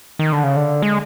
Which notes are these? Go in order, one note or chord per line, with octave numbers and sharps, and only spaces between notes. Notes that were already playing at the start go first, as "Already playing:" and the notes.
D#3
D3
C#3
D3
G#3